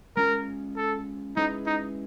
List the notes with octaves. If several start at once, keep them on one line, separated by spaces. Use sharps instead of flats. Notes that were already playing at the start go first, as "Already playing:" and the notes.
G#3 C#4 F4 A#4
A4
G#3 C#4 D#4 E4 G#4 B4
D#4